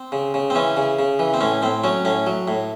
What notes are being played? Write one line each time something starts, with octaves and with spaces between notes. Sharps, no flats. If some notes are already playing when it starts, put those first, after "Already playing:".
Already playing: C4
C#3
C#3
C4
E3 C#4
C#3
C#3
E3
C4
A2 C#4
A2 C4
F#3 C#4
A2 C#4
F#3
A2